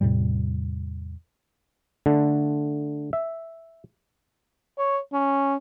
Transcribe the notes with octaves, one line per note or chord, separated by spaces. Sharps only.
E2 A2 C3 G3
D3 A3
E5
C#5
C#4